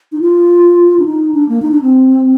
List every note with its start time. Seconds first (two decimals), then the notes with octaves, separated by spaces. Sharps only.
0.12 D#4
0.21 F4
0.99 D4
1.05 D#4
1.34 D4
1.49 A#3
1.62 D#4
1.72 D4
1.82 C4